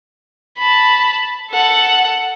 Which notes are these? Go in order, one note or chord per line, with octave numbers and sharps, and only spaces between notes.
A5 B5
A4 F#5